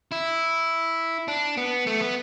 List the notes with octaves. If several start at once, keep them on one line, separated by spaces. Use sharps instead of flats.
E4
D4
B3
A3
B3